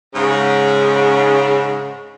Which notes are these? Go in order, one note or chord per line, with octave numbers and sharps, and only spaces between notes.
G#2 C#3